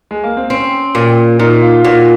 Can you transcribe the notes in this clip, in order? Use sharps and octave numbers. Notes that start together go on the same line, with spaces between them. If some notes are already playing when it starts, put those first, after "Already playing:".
G#3
A#3
C4
C4 C#4
A#2
A#2 D#4
F4
A#2 F#4